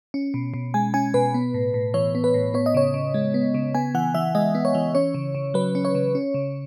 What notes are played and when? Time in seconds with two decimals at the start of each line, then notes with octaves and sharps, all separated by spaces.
0.14 C#4
0.34 B2
0.54 B2
0.74 G#3 G#5
0.94 C#4 G#5
1.14 B2 B4
1.34 B3
1.54 A2
1.74 A2
1.94 E3 C#5
2.15 B3
2.24 B4
2.34 A2
2.54 B3 C#5
2.66 D#5
2.74 C#3 C#5
2.94 C#3
3.14 G#3
3.34 B3
3.54 C#3
3.75 B3 G#5
3.95 E3 F#5
4.14 E3 E5
4.35 G#3 D#5
4.55 B3
4.65 C#5
4.75 E3
4.95 C#4 C#5
5.14 C#3
5.35 C#3
5.54 F#3 B4
5.75 C#4
5.85 C#5
5.95 C#3
6.15 C#4
6.34 C#3